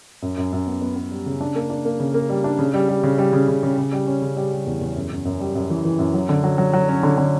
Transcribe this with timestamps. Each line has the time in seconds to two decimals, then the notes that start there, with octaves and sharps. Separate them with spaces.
0.22 F#2
0.37 F#2
0.52 F#2
0.67 B3
0.81 B3
0.96 B3
1.11 G3
1.26 C#3
1.41 D4
1.55 A#3
1.70 D4
1.85 A#3
2.00 C#3
2.14 A#3
2.29 G3
2.44 D4
2.59 C#3
2.74 G3
2.89 G3
3.03 C#3
3.18 G3
3.33 C#3
3.48 C#3
3.63 C#3
3.78 C#3
3.92 G3
4.07 C#4
4.22 C#3
4.37 G3
4.51 G3
4.66 E2
4.81 E2
4.96 F#2
5.11 F#2
5.25 F#2
5.40 G3
5.55 F#2
5.70 E3
5.85 E3
5.99 F#2
6.14 F#3
6.29 D3
6.44 F#3
6.58 F#3
6.73 F#3
6.89 C#4
7.03 D3
7.18 D3